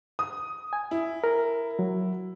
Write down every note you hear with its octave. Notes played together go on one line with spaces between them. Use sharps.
D#6
G#5
E4
A#4
F#3